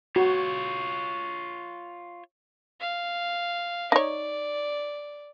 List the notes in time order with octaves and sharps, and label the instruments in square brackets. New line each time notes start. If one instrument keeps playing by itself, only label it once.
[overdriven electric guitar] F4 C#5 [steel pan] F#4
[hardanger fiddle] F5
[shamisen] D#4 C#5 [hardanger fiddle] D5